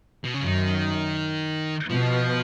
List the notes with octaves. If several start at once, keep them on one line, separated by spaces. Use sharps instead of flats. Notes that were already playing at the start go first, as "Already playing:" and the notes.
B2
C#3
F#2 D#3
B2 F3